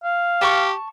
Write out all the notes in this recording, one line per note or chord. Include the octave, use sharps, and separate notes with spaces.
F5
G4 A5 C#6